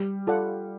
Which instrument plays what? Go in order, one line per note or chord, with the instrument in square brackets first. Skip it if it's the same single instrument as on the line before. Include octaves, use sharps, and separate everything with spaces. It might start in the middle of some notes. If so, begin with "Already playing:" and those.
Already playing: [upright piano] G3
[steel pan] F4 A4 D5 F#5